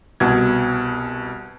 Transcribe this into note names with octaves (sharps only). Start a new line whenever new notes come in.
C2 B2 G#6